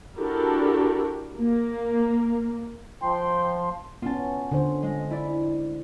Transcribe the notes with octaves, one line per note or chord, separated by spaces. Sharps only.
D4 E4 F#4 G4 A4 A#4
A#3
F3 G5 C6
B3 C#4 F4 A5
D3 C5
G#3
E4 D5